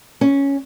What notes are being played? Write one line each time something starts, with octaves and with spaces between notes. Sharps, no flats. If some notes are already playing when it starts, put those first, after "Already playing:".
C#4